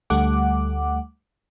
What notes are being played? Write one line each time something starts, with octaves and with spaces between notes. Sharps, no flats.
D2 G3 A3 F#5 D6